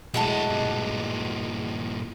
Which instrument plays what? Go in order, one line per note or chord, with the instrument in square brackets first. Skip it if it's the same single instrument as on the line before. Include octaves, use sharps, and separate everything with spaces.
[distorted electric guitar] B2 E4 [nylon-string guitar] F#3 G#3 A3 [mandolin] D#5 F#5 A5
[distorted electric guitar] G2 A#2